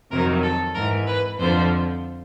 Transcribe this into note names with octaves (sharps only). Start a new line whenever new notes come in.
F2 C3 D#3 F#3 A#4
A4
G#2 E3 A#4
B4
F2 D3 F3 C5